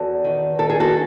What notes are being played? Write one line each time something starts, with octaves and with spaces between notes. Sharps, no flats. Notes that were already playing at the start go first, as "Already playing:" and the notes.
Already playing: E2 F#4 A4
D#3
D#3 A4
G#4
F#4 A4